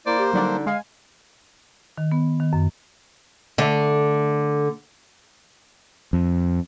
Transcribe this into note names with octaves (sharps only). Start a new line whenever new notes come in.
A#3 E4 C5 D5
G4
D3 F#3 G3 D4 D#4
G#3 F5 G#5
D#3
B3
D#3
F#2
D3 A3
F2